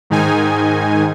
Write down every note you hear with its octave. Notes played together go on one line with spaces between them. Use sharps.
G#2 D#3 D#4 G#5